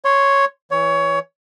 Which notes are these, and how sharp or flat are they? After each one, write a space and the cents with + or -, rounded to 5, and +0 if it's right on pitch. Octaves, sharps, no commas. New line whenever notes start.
C#5 +0 C6 +0
E3 +0 C#5 +20